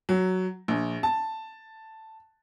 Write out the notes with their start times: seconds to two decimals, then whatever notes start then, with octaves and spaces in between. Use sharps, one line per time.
0.09 F#3
0.68 A#1
1.03 A5